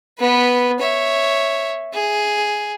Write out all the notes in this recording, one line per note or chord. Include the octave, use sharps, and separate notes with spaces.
B3 B4
C#5 E5
G#4